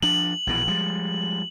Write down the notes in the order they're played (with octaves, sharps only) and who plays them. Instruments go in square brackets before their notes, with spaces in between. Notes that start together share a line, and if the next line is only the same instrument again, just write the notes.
[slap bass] F3 D4 [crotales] F#7
[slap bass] A#1 B2 E3
F3 G3 G#3